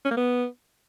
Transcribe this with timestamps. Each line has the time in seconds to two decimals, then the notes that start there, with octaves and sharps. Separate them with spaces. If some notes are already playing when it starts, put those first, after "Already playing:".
0.05 C#4
0.11 A#3
0.17 B3